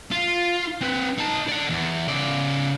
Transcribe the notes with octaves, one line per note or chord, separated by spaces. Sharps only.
F4
C4 B4
D#4 A5
D5 F#5
E2
C#3 D5